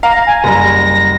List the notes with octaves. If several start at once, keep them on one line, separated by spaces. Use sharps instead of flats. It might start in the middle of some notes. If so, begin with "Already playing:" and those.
F5 A#5
G#5
F#1 G3 A#5 A#6